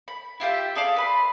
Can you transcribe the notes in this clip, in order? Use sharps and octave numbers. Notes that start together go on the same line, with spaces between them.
B5
E4 F4 G4 E5
G#4 A4 D5 F5
B4 B5 C6